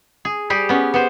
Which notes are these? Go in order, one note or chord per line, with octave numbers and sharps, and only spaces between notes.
G#4
G3 G4 G#4
B3 C#4
B3 C5